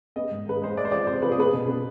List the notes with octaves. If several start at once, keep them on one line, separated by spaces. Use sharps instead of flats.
B3 D#5
G#2
D#3 B4
G#3 C5
G#3 D5
C5
F2 D5
C3 C5
F3 B4
G#4
B3 B4
B2
B3